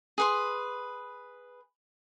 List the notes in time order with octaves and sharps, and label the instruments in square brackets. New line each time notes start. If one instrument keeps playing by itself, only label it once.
[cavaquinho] G#4 B4 C6